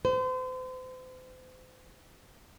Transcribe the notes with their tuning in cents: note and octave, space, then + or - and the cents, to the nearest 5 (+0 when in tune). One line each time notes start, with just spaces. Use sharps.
C5 -40